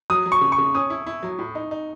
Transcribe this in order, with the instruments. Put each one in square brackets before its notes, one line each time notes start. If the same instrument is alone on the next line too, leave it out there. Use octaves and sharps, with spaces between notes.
[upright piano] F#3 [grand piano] D#6
[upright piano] F#3
[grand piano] C#6
[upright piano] C#3
[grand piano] C#6
[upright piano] C#3
[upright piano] C#4 [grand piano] D#6
[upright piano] E4
E4
F#3
A2
D#4
D#4